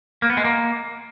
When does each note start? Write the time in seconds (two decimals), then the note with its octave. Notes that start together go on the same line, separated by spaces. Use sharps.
0.22 A#3
0.30 B3
0.37 G#3
0.45 A#3